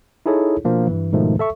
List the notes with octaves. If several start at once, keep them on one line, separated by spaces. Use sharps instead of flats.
D#4 E4 G#4 A4 C#5
B2 F3 A#3 D4
G2 E3
G#2 B2 D#3 F3 A3
A4 E5 C#6